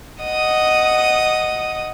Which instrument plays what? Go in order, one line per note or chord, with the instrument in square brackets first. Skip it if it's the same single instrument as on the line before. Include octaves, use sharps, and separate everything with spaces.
[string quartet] D#5 F#5 D#6